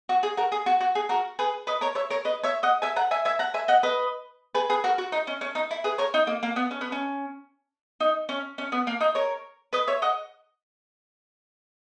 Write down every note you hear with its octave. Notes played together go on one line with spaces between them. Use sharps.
F#4
G#4
F#4 A#4
G#4
F#4
F#4
G#4
F#4 A#4
G#4 B4
B4 D#5
A#4 C#5
C#5 E5
A#4 C#5
B4 D#5
C#5 E5
D#5 F#5
E5 G#5
F#5 A#5
E5 G#5
E5 G#5
F#5 A#5
E5 G#5
D#5 F#5
B4 D#5
G#4 B4
G#4 B4
F#4 A#4
F#4
D#4
C#4
C#4
D#4
E4
G#4 B4
A#4 C#5
D#4
A#3
A#3
B3
C#4
B3
C#4
D#4
C#4
C#4
B3
A#3
D#4
A#4 C#5
B4 D#5
C#5 E5
D#5 F#5